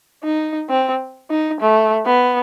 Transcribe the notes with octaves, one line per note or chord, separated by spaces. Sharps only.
D#4
C4
D#4
A3
B3